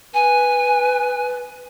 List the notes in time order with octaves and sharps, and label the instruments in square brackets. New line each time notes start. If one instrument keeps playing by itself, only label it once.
[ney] B4 [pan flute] G#5